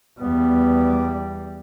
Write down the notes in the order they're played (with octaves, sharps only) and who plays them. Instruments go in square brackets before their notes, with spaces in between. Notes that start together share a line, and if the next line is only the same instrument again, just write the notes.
[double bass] E2 G3 [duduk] B3